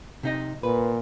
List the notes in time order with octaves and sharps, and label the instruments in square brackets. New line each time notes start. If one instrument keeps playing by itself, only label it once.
[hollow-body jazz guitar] C3 D#4 D#5
[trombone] A#2 [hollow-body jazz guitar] B4